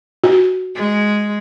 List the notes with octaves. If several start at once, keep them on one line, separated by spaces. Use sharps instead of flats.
F#4
G#3